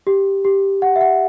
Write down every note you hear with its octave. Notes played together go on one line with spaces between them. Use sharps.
G4
G4
F#5
E5
F#5